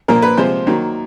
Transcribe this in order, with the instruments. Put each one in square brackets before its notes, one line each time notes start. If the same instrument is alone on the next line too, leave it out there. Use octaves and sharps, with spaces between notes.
[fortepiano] A#2 F3 A#3 A#4
B4
C3 F3 G#3 C5
D#3 F#3 A#3